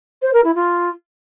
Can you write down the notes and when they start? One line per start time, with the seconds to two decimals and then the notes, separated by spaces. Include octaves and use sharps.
0.22 C5
0.33 A#4
0.44 E4
0.55 F4